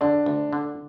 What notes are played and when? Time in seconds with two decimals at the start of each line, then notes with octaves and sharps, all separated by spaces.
0.01 D3 D4
0.26 D2
0.53 D3